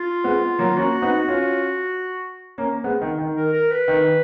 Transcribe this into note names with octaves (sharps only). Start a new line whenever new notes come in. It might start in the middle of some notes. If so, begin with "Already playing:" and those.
Already playing: F4
G#3 B3
F#3 A#3
A#3 C#4 F#4
B3 D#4
C#4 F4
A#3 C#4
G#3 B3
D#3
D#3
A#4
A#4
B4
D#3